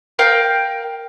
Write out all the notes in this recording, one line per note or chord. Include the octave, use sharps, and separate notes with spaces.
A#4 F5 G5 G6